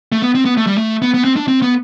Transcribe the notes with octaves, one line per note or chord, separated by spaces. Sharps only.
A3
B3
C4
B3
A3
G3
A3
B3
B3
C4
D4
C4
B3